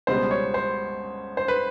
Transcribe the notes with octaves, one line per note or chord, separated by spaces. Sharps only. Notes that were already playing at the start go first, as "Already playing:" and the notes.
C#2 B2 G3 B3 C5
C#5
C5
C5
B4